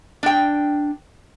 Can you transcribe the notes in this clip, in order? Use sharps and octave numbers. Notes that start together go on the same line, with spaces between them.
D4 G5